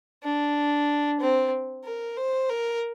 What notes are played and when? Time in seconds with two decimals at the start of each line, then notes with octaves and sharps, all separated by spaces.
0.23 D4
1.20 C4
1.84 A#4
2.17 C5
2.49 A#4